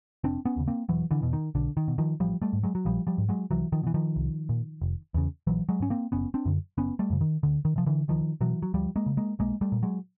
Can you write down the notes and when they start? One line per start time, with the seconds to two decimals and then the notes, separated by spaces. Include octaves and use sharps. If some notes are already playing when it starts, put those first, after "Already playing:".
0.24 F1 C4 D4
0.45 B3 C#4
0.56 D#2 C#3
0.68 A#3 C4
0.89 E1 E3 F#3
1.11 D3 E3
1.22 E2 B2
1.33 D#3
1.55 B1 D3
1.77 D#3
1.88 B2
1.98 D#3 F3
2.20 A1 F3 G3
2.42 G3 A3
2.53 G#2
2.63 F#3 G#3
2.75 F#3
2.85 A#1 F3 G3
3.07 F3 G3
3.18 G#2
3.29 F#3 G#3
3.51 C2 E3 F#3
3.72 D#3 F3
3.83 B2 E3
3.94 D#3 F3
4.16 C2
4.49 A#2
4.82 F1
5.14 E2 C#3
5.47 A#1 E3 F#3
5.69 F#3 G#3
5.80 G#2 C#4
5.90 A#3 C4
6.12 F#1 B3 C#4
6.34 C4 D4
6.45 F#2 D3
6.78 F#1 B3 C#4
6.99 G3 A3
7.10 F#2 C#3
7.21 D#3
7.43 D2 D3
7.65 D#3
7.76 C3 F3
7.86 D3 E3
8.08 C#2 D#3 F3
8.41 B2 E3 F#3
8.62 F#3
8.74 D2 F3 G3
8.96 G#3 A#3
9.06 C#3
9.17 G#3 A#3
9.39 B1 G#3 A#3
9.61 G3 A3
9.72 A#2
9.83 F#3 G#3